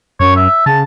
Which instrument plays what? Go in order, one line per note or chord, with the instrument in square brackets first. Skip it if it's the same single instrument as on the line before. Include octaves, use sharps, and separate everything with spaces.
[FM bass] F#2 [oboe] C#5
[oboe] E5
[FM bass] C#3 [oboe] A5